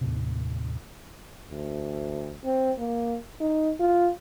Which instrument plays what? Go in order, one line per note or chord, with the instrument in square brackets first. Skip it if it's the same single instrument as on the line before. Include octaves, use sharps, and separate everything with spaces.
[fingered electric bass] D#2 A2 C3
[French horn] D2
C4
A#3
D#4
F4